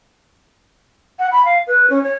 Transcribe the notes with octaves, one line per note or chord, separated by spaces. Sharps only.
F#5
B5
F5
B4
C#4
C#5